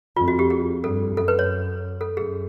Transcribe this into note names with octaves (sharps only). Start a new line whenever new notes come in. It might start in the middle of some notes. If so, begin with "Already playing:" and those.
F2 F4
F#4
G4
G#4
G2 A4
F#2 A4
B4
C#5
A4
F#2 G#4